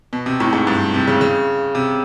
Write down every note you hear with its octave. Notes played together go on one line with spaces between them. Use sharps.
B2
C3
A2
G#2
G2
C3
C#3
C#3
C3